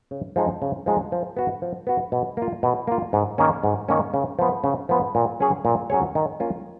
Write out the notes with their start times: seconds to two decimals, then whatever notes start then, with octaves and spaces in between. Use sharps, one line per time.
0.11 C#3
0.36 F3 G#3 D#4 G#4
0.62 C#3
0.86 F3 G#3 D#4 G#4
1.12 F3
1.37 B3 F#4
1.62 F3
1.87 B3 F#4
2.12 B2
2.37 A#3 F4
2.63 B2
2.87 A#3 F4
3.13 G#2
3.38 D#3 A#3 C#4
3.64 G#2
3.89 D#3 A#3 C#4
4.14 C#3
4.39 F3 B3
4.64 C#3
4.89 F3 B3
5.15 A#2
5.40 F#3 C#4 G#4 C#5
5.65 A#2
5.90 F#3 C#4 G#4 C#5
6.15 D#3
6.40 A#3 C#4 F4